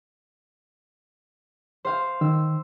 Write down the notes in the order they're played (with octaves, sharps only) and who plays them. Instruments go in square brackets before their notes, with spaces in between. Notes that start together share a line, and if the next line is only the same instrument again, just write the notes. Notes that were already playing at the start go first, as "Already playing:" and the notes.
[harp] C5 F5
[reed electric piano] D#3 [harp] E6